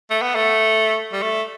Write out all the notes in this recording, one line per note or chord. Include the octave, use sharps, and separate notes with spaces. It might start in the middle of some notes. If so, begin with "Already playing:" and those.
A3
B3
A3
G3
A3